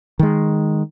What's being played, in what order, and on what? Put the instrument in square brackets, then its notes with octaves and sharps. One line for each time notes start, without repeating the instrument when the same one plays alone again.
[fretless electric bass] D#3 G#3